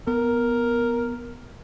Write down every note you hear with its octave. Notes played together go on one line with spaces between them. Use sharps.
B3 A#4